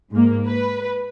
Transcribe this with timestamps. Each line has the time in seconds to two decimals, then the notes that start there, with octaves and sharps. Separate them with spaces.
0.12 G#2 A#3
0.48 B4